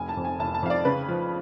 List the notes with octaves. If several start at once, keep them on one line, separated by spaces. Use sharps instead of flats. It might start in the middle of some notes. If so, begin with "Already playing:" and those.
Already playing: F1 G#5
A5
F2
G#5
F1 A5
A5
F2 F5
D5
C#3 B4
F3